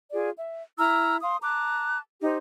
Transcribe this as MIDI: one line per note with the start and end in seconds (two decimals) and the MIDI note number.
0.12 0.30 65
0.12 0.30 68
0.12 0.30 74
0.37 0.63 76
0.77 1.16 64
0.77 1.16 82
0.77 1.16 88
0.77 1.16 89
1.23 1.38 77
1.23 1.38 84
1.23 1.38 87
1.42 2.00 81
1.42 2.00 82
1.42 2.00 86
1.42 2.00 90
2.22 2.37 63
2.22 2.37 67
2.22 2.37 72